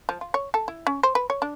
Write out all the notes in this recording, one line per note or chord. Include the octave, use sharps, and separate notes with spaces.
F3
F4
C#5
A4
E4
C#4
C5
B4
C#5
D4